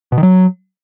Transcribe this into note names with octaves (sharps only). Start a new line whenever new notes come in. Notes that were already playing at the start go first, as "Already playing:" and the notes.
B2
D#3
F#3